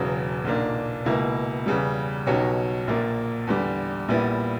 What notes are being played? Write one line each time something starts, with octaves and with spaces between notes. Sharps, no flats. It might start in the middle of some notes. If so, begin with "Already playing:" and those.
Already playing: E1 E2 C#3 F#3
B1 A#2 A#3 D4
C#2 B2 A#3 E4
E2 C#3 G3
B1 B2 F#3 C#4 G4
A#1 A#2 A#3
E2 D3 G3
A#1 A#2 G3 B3 E4